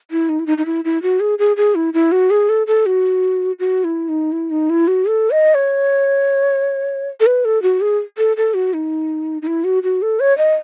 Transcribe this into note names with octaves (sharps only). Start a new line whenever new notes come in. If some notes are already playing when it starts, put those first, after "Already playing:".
E4
D#4
E4
D#4
D#4
E4
E4
F#4
G#4
G#4
G#4
E4
E4
F#4
G#4
A4
A4
F#4
F#4
E4
D#4
E4
D#4
E4
F#4
A4
D#5
C#5
A4
B4
A4
F#4
G#4
A4
A4
F#4
D#4
D#4
E4
F#4
F#4
A4
C#5
D#5